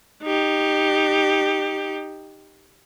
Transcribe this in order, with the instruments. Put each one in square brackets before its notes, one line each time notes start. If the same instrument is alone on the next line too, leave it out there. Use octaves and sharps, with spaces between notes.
[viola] D#4 G4